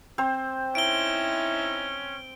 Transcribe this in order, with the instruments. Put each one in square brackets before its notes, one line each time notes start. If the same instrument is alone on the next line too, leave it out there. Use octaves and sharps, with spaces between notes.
[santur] C4 C5
[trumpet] C#4 [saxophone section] D#4 E4 [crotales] D7 G7